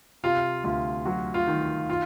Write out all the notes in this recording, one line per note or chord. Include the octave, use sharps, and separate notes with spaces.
C3 F4
D2 F4
F#3 F#4
F4
D#3
F4